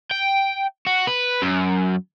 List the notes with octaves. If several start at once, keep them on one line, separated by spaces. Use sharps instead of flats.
G5
F#4
B4
F#2